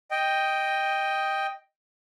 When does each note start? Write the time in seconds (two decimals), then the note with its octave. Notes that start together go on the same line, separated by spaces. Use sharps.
0.11 D#5 G5